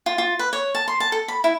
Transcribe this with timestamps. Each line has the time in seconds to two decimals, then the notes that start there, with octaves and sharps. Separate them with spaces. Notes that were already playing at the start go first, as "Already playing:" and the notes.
0.06 F4
0.18 F4
0.39 B4
0.53 C#5
0.75 A5
0.88 C6
1.00 A5
1.12 A4
1.28 B5
1.44 E4